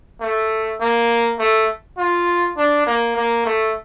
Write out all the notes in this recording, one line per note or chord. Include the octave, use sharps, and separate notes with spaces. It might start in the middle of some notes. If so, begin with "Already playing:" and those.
A3
A#3
A3
F4
D4
A#3
A#3
A3